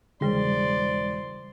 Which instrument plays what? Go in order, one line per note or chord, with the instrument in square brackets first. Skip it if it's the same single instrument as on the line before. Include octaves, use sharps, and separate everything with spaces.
[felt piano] E1 [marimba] C#3 G3 G#4 [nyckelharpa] C5 C6 [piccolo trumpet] D5